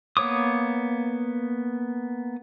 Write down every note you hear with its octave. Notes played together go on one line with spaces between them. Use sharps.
A#3 B3 C#5 D6 D#6